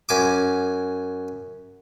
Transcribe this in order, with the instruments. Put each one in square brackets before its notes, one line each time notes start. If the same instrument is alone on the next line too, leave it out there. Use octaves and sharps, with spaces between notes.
[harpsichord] F#2 G#5 D6